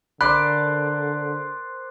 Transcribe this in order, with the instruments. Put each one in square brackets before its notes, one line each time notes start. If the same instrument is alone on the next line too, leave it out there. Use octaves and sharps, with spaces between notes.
[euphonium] D3 [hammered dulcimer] A#4 C5 D5 [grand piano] B5 [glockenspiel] F#6